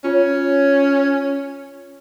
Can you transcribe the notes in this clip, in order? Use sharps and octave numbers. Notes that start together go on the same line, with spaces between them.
C#4 F4 C#5